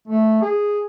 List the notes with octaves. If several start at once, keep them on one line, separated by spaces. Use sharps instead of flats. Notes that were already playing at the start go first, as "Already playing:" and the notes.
A3
G#4